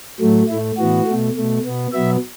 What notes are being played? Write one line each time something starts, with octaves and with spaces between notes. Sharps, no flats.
A2 F#3 A3
A2 A3 E4
A2 E3 B3 F#4
A3
B2
B2 A3
B2 B3
B2 F#3 B3 E5